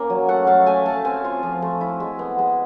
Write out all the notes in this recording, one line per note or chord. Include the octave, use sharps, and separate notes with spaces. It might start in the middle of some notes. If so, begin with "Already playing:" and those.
Already playing: A#3 C#4 G#5
F#3
A3 F#5
A3 F5
A3 G#5
A3 A5
C4 G#5
F4
F3
A3
E4
G#3
B3
G#3